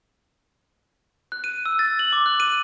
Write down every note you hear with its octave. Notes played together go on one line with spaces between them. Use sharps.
F#6
D#7
E6
A6
F#7
D6
F#6
D#7